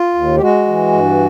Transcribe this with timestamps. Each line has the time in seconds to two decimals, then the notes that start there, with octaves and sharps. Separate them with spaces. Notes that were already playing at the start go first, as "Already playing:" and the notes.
Already playing: F4
0.14 D#2
0.37 G4
0.40 G#3 F#4
0.67 E3
0.92 G2